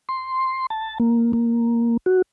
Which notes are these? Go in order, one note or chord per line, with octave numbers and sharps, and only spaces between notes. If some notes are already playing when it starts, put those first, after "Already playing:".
C6
A5
A#3
A#3
F#4